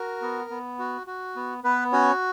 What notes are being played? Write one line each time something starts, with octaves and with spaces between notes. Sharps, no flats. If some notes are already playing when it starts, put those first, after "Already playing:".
Already playing: F#4 A#4
B3
B3
F#4
F#4
B3
B3 B4
C#4 F#4 C#5